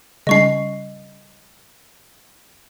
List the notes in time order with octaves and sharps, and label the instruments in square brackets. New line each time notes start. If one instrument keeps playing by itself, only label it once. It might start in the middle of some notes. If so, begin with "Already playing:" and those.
[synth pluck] C#3 G3 C#4 [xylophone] D#5 C#6 C7